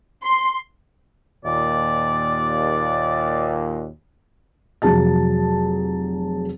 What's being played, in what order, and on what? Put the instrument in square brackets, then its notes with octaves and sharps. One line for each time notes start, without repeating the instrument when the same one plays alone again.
[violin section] C6
[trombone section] D#2 A#2 [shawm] D5
[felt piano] F1 F#3 G#4 A5 A6